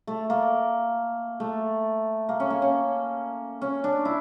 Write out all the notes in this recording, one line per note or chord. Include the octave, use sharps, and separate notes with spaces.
A3
A#3
A3
A#3
C#4
A#3
C#4
C#4
D4
E4